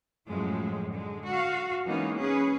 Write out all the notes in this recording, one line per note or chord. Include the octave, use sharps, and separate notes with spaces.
F#2 A2 F3 F#3 G#3
D3 G#3
F#4 F5
E3 G#3 A#3 B3 C#4 D#4
C#4 G#4 B4